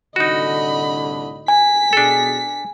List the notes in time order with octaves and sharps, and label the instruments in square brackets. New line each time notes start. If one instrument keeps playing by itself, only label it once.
[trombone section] C2 A2 D3 [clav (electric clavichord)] D#4 F#4 [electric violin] D#5 B5
[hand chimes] G#5 [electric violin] B6
[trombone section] B2 G#4 [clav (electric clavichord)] D4 A4